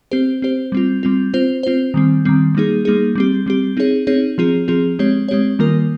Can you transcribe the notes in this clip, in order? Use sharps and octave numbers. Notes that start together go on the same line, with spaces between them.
C4 G4 C5
C4 G4 C5
G3 C4 F4
G3 C4 F4
C4 F4 C5
C4 F4 C5
D#3 G3 C4
D#3 G3 C4
G3 A#3 D#4 G#4
G3 A#3 D#4 G#4
G3 C4 G4
G3 C4 G4
C4 D#4 G#4 C#5
C4 D#4 G#4 C#5
F3 C4 F4 G#4
F3 C4 F4 G#4
G#3 C4 G4 C#5
G#3 C4 G4 C#5
D#3 G3 A#3 F4 A#4